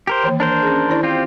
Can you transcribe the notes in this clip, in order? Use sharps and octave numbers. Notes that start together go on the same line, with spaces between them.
G4 A#4 C5
D#3 E3 A#3
D4 A#4 C5
C#4 G#4
D#3 E4 D5
C4 F4 G4